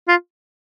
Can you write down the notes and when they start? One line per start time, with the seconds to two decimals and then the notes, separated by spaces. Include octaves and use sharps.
0.08 F4